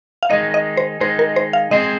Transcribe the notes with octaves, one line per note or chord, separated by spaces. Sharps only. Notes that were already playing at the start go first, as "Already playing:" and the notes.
F5
D#3 G#3 D#4 D#5
D#5
C5
D#3 G#3 D#4 C5
A#4
C5
F5
G#3 C4 G#4 C5 D#5